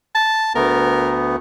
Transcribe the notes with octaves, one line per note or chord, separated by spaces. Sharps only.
A5
D2 A3 B3 A#4